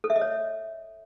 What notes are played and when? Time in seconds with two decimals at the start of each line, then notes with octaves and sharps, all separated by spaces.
0.04 A4
0.10 E5
0.16 D#5
0.21 C#5